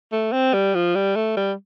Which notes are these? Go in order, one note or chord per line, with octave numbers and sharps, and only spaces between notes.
A3
C4
G3
F3
G3
A3
G3